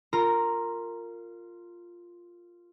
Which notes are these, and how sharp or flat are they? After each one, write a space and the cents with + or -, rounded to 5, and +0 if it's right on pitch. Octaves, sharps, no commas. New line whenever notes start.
F4 +0 A#4 -20 A#5 +0